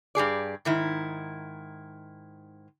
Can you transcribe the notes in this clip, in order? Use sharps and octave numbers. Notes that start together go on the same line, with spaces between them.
G2 G4 G#4 D5
G#2 D#3 E4